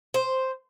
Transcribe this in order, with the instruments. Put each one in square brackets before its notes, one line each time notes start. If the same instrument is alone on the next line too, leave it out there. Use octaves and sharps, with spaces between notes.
[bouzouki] C5